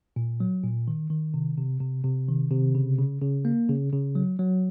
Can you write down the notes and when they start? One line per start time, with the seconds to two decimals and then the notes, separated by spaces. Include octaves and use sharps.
0.16 A#2
0.40 F#3
0.64 A#2
0.88 D#3
1.10 D#3
1.34 C3
1.57 C3
1.81 C3
2.04 C3
2.28 D#3
2.51 C3
2.75 C#3
2.99 C#3
3.22 C#3
3.45 A#3
3.69 C#3
3.93 C#3
4.15 F#3
4.39 F#3